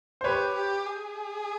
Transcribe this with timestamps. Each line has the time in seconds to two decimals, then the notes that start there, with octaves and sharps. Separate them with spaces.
0.21 C5
0.24 G4 B4 C#5
0.55 G4
0.86 G#4